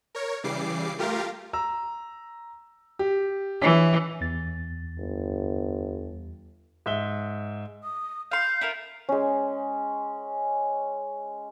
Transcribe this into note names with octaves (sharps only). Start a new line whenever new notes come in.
A#4 C#5
C#3 E3 G3 D6 C7
A3 F4 G4 A#4 F5
A#5 E6
G4
E3 C#5 G#5 B6
E2 A6
G1
G#2 E5 G7
D#6
F5 C6 G6
E4 F4 A#4
G#3 C#4